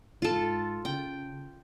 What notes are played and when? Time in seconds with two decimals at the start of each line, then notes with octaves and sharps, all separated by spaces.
0.22 G#2 F4 A4
0.85 C#3 G5